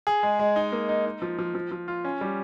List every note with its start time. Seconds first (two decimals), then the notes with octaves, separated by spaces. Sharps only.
0.07 G#4
0.23 G#3
0.39 G#3
0.56 D#4
0.72 A#3
0.89 D#4
1.06 D#4
1.22 F3
1.38 F3
1.55 F3
1.71 F3
1.88 F4
2.05 C#4
2.21 G3